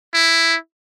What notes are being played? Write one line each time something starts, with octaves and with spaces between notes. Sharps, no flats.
E4